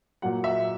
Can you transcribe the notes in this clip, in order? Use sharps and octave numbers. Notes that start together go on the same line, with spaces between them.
A#2 F#3 F#5
E5